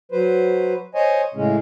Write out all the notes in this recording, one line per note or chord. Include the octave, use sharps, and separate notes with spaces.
F#3 B4 C5
C5 C#5 D#5 G#5
A2 C#3 G#3 C#4